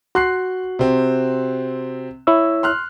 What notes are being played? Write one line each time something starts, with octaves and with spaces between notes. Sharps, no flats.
F#4 C6 F#6 C7
C3 C4
E4 C#5 E6
C6 F6 F#6